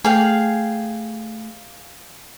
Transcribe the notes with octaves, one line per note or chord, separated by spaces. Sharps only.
A3 G#4 F5 G5